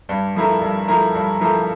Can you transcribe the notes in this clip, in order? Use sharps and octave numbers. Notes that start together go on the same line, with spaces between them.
G2
F3 A3 E4 A#4
G2
F3 A3 E4 A#4
G2
F3 A3 E4 A#4